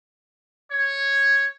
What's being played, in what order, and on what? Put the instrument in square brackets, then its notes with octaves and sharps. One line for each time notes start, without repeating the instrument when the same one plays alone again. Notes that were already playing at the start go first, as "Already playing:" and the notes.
[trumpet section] C#5